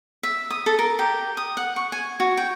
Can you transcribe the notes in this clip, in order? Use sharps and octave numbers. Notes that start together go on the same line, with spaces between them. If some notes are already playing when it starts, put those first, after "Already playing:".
E5
D#6
A4
A#4
G4
D#6
F#5
C#6
G#5
F#4
G5